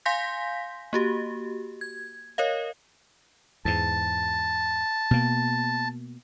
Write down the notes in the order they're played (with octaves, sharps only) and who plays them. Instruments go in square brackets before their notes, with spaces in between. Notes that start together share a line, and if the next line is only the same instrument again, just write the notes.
[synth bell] F5 G#5 C6 G6 A#6 B6
A#3 F#4 G4
G#6
A#4 C#5 D#5 F5
[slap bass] E2 G#2 [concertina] A5
[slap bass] B2 A#3